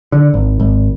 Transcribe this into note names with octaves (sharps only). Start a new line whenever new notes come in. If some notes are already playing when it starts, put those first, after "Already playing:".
D3
G#1
G#1